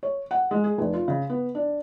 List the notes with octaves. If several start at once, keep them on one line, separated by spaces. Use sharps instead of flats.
C#5
F#5
G#3
G#4
F1
F4
C#3
B3
D4